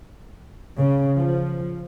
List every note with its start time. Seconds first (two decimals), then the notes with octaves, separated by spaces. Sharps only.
0.77 C#3
1.15 F3